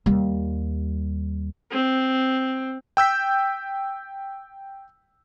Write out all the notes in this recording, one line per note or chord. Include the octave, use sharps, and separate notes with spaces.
D#2 G3
C4
G5 E6 G6 B6